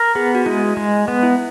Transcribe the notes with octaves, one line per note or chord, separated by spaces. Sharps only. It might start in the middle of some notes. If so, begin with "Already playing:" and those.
Already playing: A#4
B3 G#4
F#4
G#3 E4
G#3
B3
E4